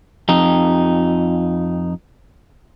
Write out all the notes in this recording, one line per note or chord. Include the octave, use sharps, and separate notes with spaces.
F2 D#4